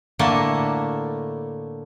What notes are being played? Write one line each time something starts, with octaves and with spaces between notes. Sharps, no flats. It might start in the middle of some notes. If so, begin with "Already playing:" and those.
A2 D3 A3 A#3 A5